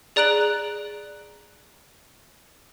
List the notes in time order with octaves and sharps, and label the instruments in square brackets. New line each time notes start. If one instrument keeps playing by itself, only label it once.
[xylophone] G#4 D5 A#5 F#6 D7 F#7